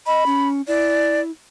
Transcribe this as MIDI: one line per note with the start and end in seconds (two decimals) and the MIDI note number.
0.07 0.24 75
0.07 0.49 83
0.26 0.62 61
0.68 1.31 64
0.68 1.21 74